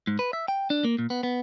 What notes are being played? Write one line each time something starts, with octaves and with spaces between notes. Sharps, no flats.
G#2
B4
E5
G5
D4
A#3
A#2
B3
B3